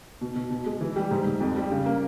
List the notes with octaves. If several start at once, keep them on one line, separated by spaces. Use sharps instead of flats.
B2
B2
B2
G#3
E3
G3
G#2
G#2
F2
G3
C#3
A#3